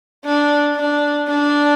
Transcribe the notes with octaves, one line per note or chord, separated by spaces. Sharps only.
D4
D4
D4